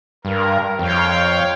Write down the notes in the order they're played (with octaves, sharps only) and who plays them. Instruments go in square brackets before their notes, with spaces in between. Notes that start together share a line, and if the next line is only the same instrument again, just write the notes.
[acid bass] G2 [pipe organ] A#4
[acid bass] F2 [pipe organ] C#5 F5 G5